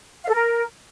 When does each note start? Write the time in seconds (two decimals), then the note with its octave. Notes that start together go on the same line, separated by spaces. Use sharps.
0.24 F5
0.29 A4
0.34 A#4